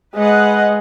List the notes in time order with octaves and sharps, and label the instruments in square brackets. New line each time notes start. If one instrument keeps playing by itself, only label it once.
[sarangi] G#3 [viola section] B4 D#5 F#5